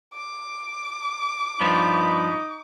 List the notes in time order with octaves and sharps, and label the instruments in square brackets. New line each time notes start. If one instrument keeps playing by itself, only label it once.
[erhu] D6
[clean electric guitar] G2 F3 B3 [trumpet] D#4 [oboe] B5